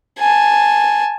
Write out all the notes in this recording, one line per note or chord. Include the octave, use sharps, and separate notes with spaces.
G#5 A5